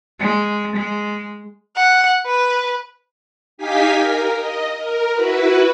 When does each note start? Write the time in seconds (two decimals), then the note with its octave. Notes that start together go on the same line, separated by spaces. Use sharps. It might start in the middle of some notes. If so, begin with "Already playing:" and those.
0.20 G#3
0.76 G#3
1.76 F#5
2.26 B4
3.58 D#4 G4 F5 G#5 B6
3.94 A#4
4.36 D#5
4.77 A#4
5.13 E4 F#4 B4